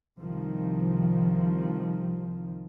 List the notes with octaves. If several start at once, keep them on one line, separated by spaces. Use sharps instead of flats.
C2 D#3 F3